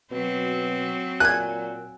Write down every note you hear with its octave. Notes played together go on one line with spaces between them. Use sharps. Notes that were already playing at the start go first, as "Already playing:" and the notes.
B2 F#3 C4
A#2 G#5 F#6 G#6